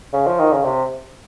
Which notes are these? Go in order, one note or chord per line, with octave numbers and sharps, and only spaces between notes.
C#3
F3
D#3
C#3
C3